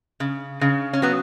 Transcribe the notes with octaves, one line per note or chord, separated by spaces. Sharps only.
C#3
C#3
C#4
F#3 B3